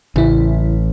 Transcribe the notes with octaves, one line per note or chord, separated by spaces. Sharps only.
A1 C#3 E4